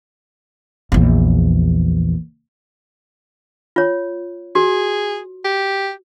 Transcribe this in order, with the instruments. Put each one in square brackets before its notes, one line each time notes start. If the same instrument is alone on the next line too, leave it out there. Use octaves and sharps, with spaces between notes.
[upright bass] A#1 E2
[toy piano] F4 C#5
[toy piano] F#4 [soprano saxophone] G#4
[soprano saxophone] G4